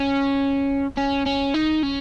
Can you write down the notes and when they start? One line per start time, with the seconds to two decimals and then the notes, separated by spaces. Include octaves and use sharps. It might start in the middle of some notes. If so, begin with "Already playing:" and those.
Already playing: C#4
0.97 C#4
1.26 C#4
1.54 D#4
1.83 C#4